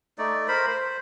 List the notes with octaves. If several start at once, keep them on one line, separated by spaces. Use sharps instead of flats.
A3 D#4 D5
A#4 C5 B5
C5